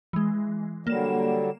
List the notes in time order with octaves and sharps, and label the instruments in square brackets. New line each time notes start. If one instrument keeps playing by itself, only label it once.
[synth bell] E3 G#3
[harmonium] D3 F#3 G3 [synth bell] A#3 E7